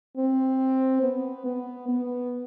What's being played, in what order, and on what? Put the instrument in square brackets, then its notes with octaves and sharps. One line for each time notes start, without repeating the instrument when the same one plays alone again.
[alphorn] C4
B3
B3
B3